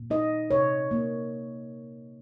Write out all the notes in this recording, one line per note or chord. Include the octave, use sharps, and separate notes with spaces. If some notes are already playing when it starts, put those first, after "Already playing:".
Already playing: A#2
D#4 D#5
C3 C#5
A#3